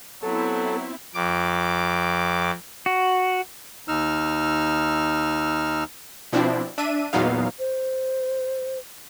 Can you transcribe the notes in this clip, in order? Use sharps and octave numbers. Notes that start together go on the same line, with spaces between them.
F#3 B3 C4 E4 A4
F2 D6
F#4
D#2 D#4 E6 F6
B2 F3 C4 D4 E4
D4 E5 D#7
E2 A#2 F#3 B3 D#4 F5
C5